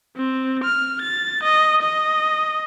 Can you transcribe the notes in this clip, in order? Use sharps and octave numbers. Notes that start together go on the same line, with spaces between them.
C4
F6
A6
D#5
D#5